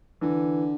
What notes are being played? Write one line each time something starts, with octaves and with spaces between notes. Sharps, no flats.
D3 E3